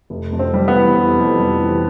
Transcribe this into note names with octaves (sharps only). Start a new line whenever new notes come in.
F1
F2
C4
G3
B3
E3
F1
F2
G3
E3